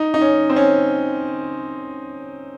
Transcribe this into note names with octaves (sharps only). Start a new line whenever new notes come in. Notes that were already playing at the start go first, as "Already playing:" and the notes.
Already playing: D#4
D#4
C#4
C4
C#4